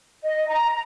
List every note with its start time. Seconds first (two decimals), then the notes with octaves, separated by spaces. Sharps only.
0.23 D#5
0.48 A#5